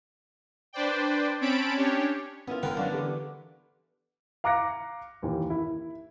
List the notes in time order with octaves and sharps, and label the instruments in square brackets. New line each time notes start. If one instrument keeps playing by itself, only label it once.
[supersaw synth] D4 B4 C5 D5 G5
C4 C#4 C#5 A5 B5 D7
C#4 D4 G4 C#5
[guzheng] B3 E4 F4 [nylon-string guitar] C#4 A#4
[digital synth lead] D3 [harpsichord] A#4 B4 [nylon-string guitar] G5
[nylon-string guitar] F#3 C#4 F5 [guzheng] D4
[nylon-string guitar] E3 G4 A4
[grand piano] F5 A#5 D6 F#6 A#6 C#7
D#2 E3
E4